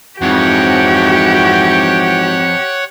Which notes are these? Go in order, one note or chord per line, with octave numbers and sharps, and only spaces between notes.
F2 G#2 E3 F#4 G4 C#5 F#5